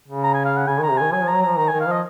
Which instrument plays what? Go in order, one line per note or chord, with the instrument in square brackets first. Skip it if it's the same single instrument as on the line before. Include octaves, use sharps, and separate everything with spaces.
[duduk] C#3
[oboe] A#5
G#5
F5
F#5
[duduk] C#3 [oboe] G#5
[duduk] D#3 [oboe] A#5
[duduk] C3
[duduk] D#3 [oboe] G#5
[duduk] F#3 [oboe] G#5
[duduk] F3 [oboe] A#5
[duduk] F#3
[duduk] F3 [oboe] A#5
[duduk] D#3 [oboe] A#5
[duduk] D#3 [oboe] G#5
[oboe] F5
[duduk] F3 [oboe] D#5